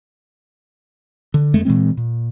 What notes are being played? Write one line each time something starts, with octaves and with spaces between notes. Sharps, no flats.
D3
F2 G#3 A3
A#2 E3 G#3 C4
A#2